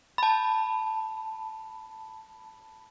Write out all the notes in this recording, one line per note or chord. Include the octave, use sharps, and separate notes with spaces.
A5 B5